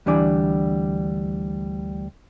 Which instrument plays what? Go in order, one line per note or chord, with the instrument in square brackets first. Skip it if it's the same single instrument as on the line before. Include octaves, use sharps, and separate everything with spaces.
[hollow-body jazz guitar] D2 E3 G3 D4 D5 G#5